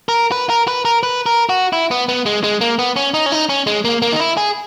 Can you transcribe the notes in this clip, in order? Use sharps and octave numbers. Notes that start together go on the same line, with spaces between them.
A#4
B4
A#4
B4
A#4
B4
A#4
F#4
E4
B3
B3
G#3
G#3
A#3
B3
C#4
D#4
C#4
D#4
C#4
G#3
A#3
A#3
D#4
E4
G#4